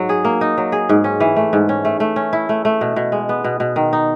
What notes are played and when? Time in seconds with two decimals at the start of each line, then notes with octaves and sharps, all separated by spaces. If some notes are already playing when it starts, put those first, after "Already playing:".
Already playing: G#2 F#3
0.09 G#4
0.25 A#3
0.41 D#4
0.58 F#3
0.72 G#4
0.89 G#2
1.04 C#4
1.20 E3
1.36 A3
1.53 G#2
1.69 C#4
1.85 A3
2.00 A3
2.16 C#4
2.33 E4
2.49 A3
2.65 A3
2.81 B2
2.96 B2
3.12 G#3
3.29 B3
3.44 B2
3.60 B2
3.76 D#3
3.93 D#4